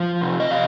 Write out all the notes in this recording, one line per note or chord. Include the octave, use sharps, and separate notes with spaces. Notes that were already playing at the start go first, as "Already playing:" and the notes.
Already playing: F3
C3
D#5
C3 F5